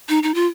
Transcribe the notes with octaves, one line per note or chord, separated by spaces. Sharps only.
D#4
D#4
F4